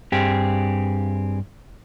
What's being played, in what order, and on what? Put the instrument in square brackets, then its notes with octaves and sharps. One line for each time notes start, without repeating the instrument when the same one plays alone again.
[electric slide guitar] G2 C4 G4 G#4